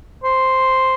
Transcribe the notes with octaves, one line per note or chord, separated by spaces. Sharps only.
C5